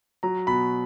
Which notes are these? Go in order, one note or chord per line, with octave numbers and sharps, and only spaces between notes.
F#3 A#5
B2 B5